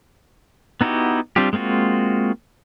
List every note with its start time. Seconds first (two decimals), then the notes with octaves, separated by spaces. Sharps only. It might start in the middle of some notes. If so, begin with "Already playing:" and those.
0.81 B3 D#4 E4 F#4 G4
1.36 G3 C4 D4 F4 G4
1.53 G#3 A#3 C4 F4 F#4